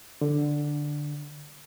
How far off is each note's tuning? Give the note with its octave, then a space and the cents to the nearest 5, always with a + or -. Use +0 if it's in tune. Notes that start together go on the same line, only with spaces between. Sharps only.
D3 +5